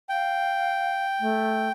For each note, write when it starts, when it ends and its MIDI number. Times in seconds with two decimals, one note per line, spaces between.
0.09 1.04 77
0.09 1.72 79
1.19 1.68 57